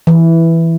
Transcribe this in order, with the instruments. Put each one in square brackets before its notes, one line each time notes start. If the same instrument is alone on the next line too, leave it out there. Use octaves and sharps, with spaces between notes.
[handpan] E3